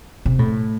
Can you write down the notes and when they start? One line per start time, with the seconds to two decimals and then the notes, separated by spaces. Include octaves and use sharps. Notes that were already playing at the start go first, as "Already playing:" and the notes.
0.25 C3
0.39 A2